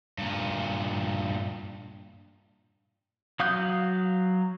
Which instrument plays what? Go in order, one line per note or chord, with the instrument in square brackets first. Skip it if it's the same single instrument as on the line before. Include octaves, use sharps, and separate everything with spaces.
[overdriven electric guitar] G2 A#2
[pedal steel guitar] F#3 F5 D#6 F#6 G6